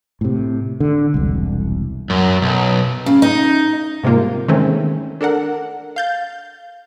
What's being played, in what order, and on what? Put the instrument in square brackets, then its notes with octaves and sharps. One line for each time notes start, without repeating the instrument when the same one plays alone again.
[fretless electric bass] A2 C3
D3
E1 C2
[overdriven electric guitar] F#2
B1
[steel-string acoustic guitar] C#3
D#4
[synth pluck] G#2 C3 G3 A#3 F4
D#3 E3 G#3 A3 C4 C#4
D4 A4 A#4 F#5
F5 G6 A6